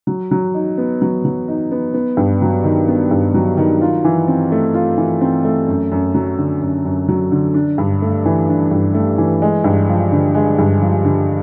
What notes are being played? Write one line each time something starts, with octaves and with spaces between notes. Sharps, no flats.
F#3
F#3
D#4
B3
F#3
F#3
D#4
B3
B3
G2
F#3
D#3
B3
G2
F#3
D#3
F4
E3
C4
A3
F4
E3
C4
A3
F#2
F#2
F#3
D3
F#2
F#2
F#3
D3
D4
G2
A3
E3
D4
G2
A3
E3
G#3
G2
F3
D3
G#3
G2
F3
D3